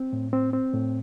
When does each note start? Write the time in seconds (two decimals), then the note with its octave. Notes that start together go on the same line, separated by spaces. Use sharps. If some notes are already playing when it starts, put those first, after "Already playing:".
Already playing: C4
0.13 A2
0.33 C4
0.53 C4
0.73 A2